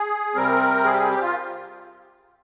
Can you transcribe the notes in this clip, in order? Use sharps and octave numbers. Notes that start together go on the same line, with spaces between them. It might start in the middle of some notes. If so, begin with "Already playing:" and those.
Already playing: G#4
C3 G3 C4 A#4
G#4
G4
G#4
G4
F4